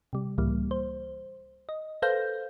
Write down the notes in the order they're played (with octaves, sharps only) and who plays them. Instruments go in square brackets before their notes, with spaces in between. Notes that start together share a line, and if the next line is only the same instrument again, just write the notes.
[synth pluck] C3 G3
C#2 A2 E3 G3 A#3
C5
D#5
A4 B4 C5 F5 G6 A#6